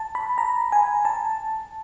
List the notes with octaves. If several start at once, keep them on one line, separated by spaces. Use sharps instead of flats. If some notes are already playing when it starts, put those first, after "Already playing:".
Already playing: A5
B5
A#5
G#5
A5